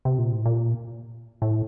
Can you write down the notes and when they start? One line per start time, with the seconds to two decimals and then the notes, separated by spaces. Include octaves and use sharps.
0.05 C3
0.18 A#2
0.32 A2
0.46 A#2
1.42 A2